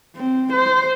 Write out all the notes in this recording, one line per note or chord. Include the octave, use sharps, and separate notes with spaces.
C4
C5